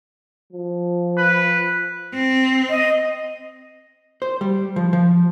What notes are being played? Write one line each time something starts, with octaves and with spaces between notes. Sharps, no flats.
F3
B4
C4
D#5
C5
G3
F3
F3